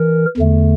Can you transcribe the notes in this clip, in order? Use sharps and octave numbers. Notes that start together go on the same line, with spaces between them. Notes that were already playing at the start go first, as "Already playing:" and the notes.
Already playing: E3 A#4
E2 D3 A3